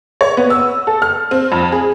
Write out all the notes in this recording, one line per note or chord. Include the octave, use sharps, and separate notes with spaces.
C#5
B3
E6
A4
F6
C4
F2
G#4